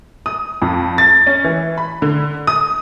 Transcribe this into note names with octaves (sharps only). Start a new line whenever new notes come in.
D#6
F2
A6
C#4
E3
B5
D3
D#6